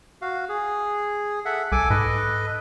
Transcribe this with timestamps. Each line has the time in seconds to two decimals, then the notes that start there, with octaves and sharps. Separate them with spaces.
0.22 F#4 F5
0.49 G#4
1.45 A4 E5 F#5
1.72 C2 A4 G#5 D6
1.90 G#2 A4 B4 D#5